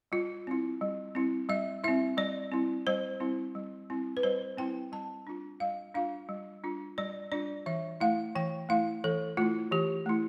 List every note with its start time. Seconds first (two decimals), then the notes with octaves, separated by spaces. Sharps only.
0.12 G3 F4
0.47 C4 E4
0.81 G3
1.15 C4 E4
1.49 G3 E5
1.84 C4 E4 E5
2.17 G3 D5
2.52 C4 E4
2.87 G3 C5
3.20 C4 E4
3.55 G3
3.90 C4 E4
4.17 B4
4.23 G3 C5
4.57 C4 E4 G5
4.92 G3 A5
5.27 D4 F4
5.60 G3 F5
5.94 D4 F4 F5
6.29 G3
6.64 D4 F4
6.98 G3 D5
7.32 D4 F4 D5
7.66 E3 E5
8.00 A3 E4 F5
8.36 E3 G5
8.69 A3 E4 F5
9.04 E3 A4
9.37 A3 E4 F4
9.72 E3 G4
10.06 A3 E4